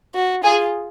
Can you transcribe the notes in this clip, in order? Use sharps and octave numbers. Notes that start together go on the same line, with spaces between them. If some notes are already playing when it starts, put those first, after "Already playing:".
F#4
F4 G#4